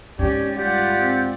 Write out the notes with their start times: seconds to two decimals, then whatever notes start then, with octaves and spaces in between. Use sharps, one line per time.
0.19 G#2 C#4 G4 D5
0.56 G3 F4 G4 D5 F#5 G6
0.97 C4